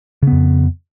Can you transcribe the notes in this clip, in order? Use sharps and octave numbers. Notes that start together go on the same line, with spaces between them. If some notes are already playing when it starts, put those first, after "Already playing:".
F2 C#3 B3